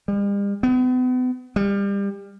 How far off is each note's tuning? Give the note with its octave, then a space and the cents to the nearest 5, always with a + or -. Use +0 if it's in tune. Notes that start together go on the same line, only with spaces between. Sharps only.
G3 +45
B3 +40
G3 +30